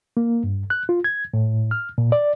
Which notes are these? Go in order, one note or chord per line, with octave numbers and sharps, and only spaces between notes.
A#3
G2
F#6
F4
G#6
A2
F6
A#2
D5